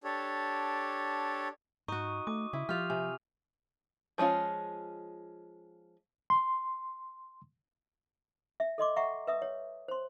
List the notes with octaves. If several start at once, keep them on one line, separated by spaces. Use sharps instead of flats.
D4 G4 A4 C#5
G#2 D#4 F#4 C#6 D#6 D#7
A3 D6
C#3 E4
F3 F4 G4 F6 F7
C3 G#5
F3 G#3 C#4 F4
C6
E5
A4 D#5 C6 D6
E5 F#5 G5 A#5 C#6
B4 E5 D#6
C#5
C5 C6